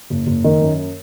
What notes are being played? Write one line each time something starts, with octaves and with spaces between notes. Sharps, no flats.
F#1
F#1
D#3
F#2